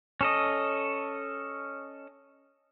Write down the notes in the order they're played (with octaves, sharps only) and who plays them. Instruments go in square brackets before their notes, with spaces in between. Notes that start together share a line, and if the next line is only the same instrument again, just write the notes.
[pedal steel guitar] C#4 A4 D#5